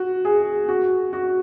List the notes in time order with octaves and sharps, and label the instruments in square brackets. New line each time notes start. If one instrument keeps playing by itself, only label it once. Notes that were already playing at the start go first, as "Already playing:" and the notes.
Already playing: [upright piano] F#4
G#4
F#4
F#4